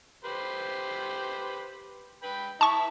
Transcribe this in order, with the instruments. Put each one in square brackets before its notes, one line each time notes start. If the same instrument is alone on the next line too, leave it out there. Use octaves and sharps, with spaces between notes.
[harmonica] G4 B4 C5
B4 G5 B5
[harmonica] E4 [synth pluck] A5 C#6